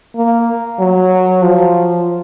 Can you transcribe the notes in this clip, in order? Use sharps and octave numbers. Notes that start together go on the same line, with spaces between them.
A#3
F#3
F3